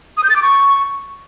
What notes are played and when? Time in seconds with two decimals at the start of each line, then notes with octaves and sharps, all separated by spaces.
0.17 D#6
0.24 G6
0.30 A6
0.36 D6
0.42 C#6